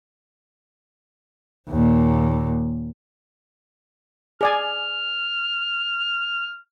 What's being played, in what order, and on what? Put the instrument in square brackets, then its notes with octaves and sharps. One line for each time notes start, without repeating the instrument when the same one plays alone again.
[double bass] D#2 A#2
[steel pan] G#4 D5 G#5 [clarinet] F6